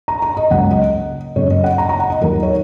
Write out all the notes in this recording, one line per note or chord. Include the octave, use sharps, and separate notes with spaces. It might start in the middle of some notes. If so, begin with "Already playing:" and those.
A#5
A#5
D#5
C#2 C#3 F#3 A#3 F#5
D#5
F#2 C#3 F#3 A#3 C#5
D#5
F#5
A#5
A#5
F#5
D#5
D#2 D#3 F#3 A#4
C#5